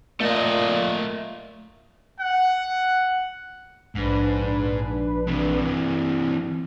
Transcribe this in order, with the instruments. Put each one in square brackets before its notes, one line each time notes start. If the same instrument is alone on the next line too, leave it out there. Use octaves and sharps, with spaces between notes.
[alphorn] A#2 [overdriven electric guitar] A3 D#5
[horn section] F#5
[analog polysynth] A#1 D4 B4 [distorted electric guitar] G#2
[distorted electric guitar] C3 E3